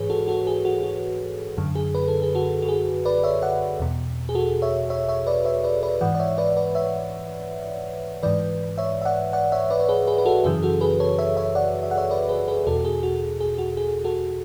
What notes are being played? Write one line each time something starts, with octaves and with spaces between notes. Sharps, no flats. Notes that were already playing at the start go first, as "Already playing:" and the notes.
Already playing: G#2 E3 G#4 B4 C#5
F#4 A4
F#4 A4
G#4
F#4
F#4
F#2 D3
G#4
B4
A4
G#4
F#4 A4
F#4
G#4
B4 D5
C#5 E5
D5 F#5
E2 B2
G#4
F#4 A4
C#5 E5
C#5 E5
C#5 E5
B4 D5
C#5 E5
B4 D5
B4 D5
G#2 E3 D5 F#5
D5
C#5 E5
B4 D5
B4 D5
C#5 E5
G#2 E3 B4 D5
C#5 E5
E5
D5 F#5
D5 F#5
C#5 E5
B4 D5
C#5
G#4 B4
G#4 B4
B4
F#4 A4
F#2 C#3 E3 G#4
F#4 A4
G#4 B4
A4 C#5
C#5 E5
C#5 E5
D5 F#5
E5
F#5
C#5 E5
B4 D5
G#4 B4
G#4 B4
E2 B2 F#4 A4
G#4
F#4
G#4
F#4
G#4
F#4 A4